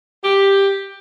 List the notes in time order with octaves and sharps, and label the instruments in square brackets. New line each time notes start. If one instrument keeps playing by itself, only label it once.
[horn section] G4